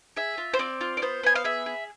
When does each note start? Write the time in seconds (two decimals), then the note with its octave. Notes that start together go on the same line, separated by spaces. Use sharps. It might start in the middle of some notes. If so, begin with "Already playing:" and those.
0.17 G#4 E5
0.38 F4
0.54 C5
0.59 C4 D5
0.81 F4
0.97 D5
1.02 B3 C5
1.23 B3 G#5
1.35 F5
1.44 G#4 E5
1.66 G#4